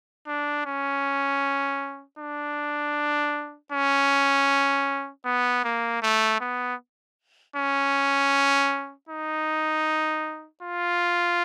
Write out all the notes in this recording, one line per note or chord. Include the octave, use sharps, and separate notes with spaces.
D4
C#4
D4
C#4
B3
A#3
A3
B3
C#4
D#4
F4